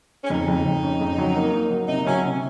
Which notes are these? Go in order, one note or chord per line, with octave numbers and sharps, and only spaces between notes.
C#4
F2 D#4
F2
F2
C#4
F2
F#3
A#3
A#3
F#3
C3 D#4
F#3 C#4
C3